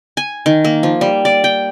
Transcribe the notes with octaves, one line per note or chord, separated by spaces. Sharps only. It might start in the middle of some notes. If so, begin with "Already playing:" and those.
G#5
D#3
A#3
F3
G3
D5
G5